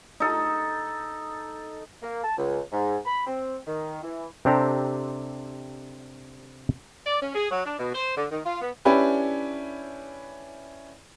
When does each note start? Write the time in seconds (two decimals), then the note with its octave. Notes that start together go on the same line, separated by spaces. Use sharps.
0.20 D#4 A4
2.02 A#3
2.24 A5
2.38 C#2
2.71 G#2
3.06 B5
3.27 C4
3.67 D#3
4.03 E3
4.45 C3 C4 D4 G4 A4 A#5
7.06 D5
7.22 C#4
7.35 G#4
7.51 F#3
7.65 D4
7.78 B2
7.93 C5
8.16 D3
8.30 D#3
8.45 F4
8.61 B3
8.85 C#4 D4 E4 G4 B4